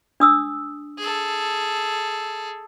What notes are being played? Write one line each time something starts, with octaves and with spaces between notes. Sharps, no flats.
D4 D#6 E6
G#4 A4